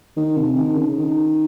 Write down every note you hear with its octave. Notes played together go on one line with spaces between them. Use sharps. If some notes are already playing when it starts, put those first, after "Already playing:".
D#3
C3
D#3
C#3
D#3